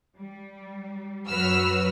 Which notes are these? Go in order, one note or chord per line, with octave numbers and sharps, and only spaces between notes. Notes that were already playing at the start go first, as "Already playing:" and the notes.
G3
F#2 F#3 F#4 B4 E6 F6